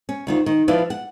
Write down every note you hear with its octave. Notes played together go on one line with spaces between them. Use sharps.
C#4
D2 D#3 F4
D#3
F3 E4 F4 B4 D5
F#5